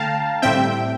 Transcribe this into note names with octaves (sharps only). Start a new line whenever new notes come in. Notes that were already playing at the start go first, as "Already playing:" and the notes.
Already playing: D3 A3 F5 G5 A5 A#5
A2 G3 C4 E5 G5